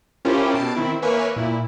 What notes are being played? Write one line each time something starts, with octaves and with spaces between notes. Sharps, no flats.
C#4 E4 F4 G4 A#4 C5
B2 A5 C7 D7
D#3 C4 E4
A#3 A#4 B4 C#5 E5 G#5
A#2 E4